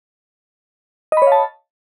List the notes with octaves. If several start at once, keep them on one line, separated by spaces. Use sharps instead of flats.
C#5 D#5 F5 A5 B5